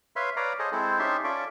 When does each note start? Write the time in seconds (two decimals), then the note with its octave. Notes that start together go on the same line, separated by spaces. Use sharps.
0.16 B4 C#5 E5 F5 B5 C6
0.37 B4 C#5 D5 F5 A#5
0.59 G#4 A4 C5 C#5 D#5
0.72 G#3 C4 E4 A4 C5
0.99 C#4 D#4 G4 E5 A5 C6
1.24 C#4 F4 A4 D5 E5